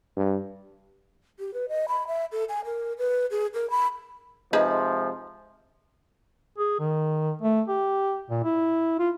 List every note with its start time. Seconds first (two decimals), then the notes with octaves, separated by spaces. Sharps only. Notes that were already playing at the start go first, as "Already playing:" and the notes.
0.17 G2
1.39 G4
1.54 B4
1.69 D#5
1.88 B5
2.07 E5
2.32 A4
2.49 G#5
2.65 A#4
2.98 B4
3.31 G#4
3.54 A#4
3.70 B5
4.53 C3 F3 G#3 D#4 G#4 B4
6.58 G#4
6.79 D#3
7.42 A3
7.68 G4
8.30 A#2
8.44 E4
8.99 F4